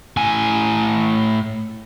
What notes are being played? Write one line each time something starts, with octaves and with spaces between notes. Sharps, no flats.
A2 G#5